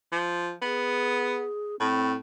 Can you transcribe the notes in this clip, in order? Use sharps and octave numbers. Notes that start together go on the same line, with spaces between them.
F3
B3 G#4
A2 C4